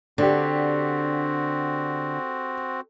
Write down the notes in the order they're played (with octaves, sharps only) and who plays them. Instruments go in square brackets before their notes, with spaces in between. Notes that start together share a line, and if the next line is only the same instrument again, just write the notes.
[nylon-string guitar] D3 [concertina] C4 F#4 [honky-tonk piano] D4 G4